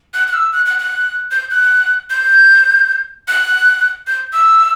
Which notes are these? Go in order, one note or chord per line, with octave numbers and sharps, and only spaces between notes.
F#6
F#6
E6
F#6
F#6
F#6
G6
F#6
G6
F#6
G6
E6